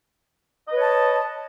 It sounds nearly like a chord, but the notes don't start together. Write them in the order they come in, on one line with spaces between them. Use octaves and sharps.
D#5 B4 C#5 A5